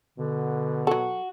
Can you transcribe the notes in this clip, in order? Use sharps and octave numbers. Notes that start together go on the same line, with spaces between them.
B2 D3
F#3 F#4 A4